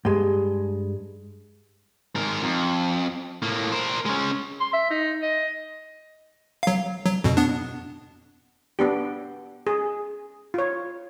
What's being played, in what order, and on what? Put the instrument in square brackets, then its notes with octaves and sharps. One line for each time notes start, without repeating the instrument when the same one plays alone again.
[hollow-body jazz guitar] G2 G#3
[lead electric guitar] G#2 A#4
F2
A2 A#3
A#4 C5
G#3 C#4
[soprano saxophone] C6
E5
D#4
D#5
[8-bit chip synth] F#3 F5
F#3
F2 B2
B3 D4
[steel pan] B3 D4 G4
G#4
F4 C#5